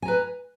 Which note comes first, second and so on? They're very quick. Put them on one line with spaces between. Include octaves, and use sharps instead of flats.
G#5 A#5 B4